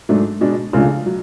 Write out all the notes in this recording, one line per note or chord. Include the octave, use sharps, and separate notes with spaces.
G#2 F#3 A3 D4
B2 G#3 D4
C#2 C#3 F3 A3 D4
F#3